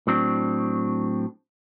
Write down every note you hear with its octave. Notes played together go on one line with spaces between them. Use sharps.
A2 F#3 C4 D4